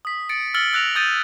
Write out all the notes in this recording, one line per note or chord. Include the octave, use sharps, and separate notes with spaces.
D#6 B6
A6 C#7 D7
E6 F6 A6 C#7 F#7 G7
E6 F#6 A#6 F7
D#6 G6 A6 D#7